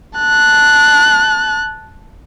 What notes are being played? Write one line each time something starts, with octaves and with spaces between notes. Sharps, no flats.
A5 F#6